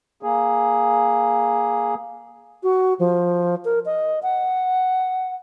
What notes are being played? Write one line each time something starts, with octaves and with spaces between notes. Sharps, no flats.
A#3 G#4
F#4
F3
A#4
D#5
F#5